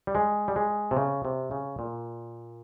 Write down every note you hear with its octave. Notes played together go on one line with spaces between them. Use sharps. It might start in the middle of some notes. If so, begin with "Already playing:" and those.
G3
G#3
G3
G#3
C3
C#3
C3
C#3
A#2